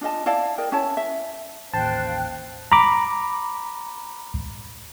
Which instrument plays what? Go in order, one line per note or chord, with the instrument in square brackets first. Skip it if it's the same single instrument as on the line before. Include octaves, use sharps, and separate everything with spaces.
[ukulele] D4 F4 D#5 A5
E4 D5 F5 A5
A#4 D5 D#5 G5
C#4 E4 C#5 A5
E5
[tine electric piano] A1 D#2 [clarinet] C5 [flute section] F5 G5 F#6 [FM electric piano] A5
[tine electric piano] A#5 B5 D6